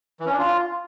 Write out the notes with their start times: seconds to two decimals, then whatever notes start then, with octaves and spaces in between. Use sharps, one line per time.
0.20 E3
0.26 C#4
0.32 D4
0.39 F4